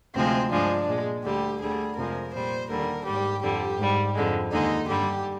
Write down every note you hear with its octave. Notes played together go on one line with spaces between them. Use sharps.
D2 C3 F3 G#3 C4
G2 F3 G#3 D4
A#2 G#3
D2 D3 G3 G4
D2 D3 G3 G#4
F2 C3 F3 G#3 A#4
A#2 G3 C5
D#2 D3 G3 A#4
G#2 G3 G4
F2 D3 G3 G4
G#2 G3
F2 D3 G#3
D#2 D3 G#3 D#4
G2 D3 G3 G4